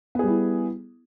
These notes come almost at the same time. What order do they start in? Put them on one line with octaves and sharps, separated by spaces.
B3 G#4 G3 E4